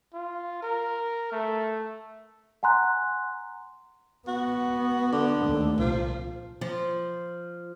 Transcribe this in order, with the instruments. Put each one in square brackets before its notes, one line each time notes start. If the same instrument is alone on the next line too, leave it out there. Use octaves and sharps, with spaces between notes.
[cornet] F4
A#4
A3
[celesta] F#5 G#5 A#5 C6 F#6
[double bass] B3 [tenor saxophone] F#4
[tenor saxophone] D3
[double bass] D#2 A3
[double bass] C2 A#2 [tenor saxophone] F3
[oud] F3